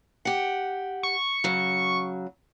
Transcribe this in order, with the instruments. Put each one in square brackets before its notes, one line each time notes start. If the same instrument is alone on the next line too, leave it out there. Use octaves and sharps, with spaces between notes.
[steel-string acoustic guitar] G4 F#5
[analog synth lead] C#6
[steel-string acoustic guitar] C#3 F#3